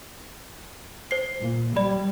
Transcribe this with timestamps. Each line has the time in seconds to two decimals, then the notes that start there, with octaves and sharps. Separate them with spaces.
1.11 C5 C7
1.40 A#2
1.76 G3 D5 B5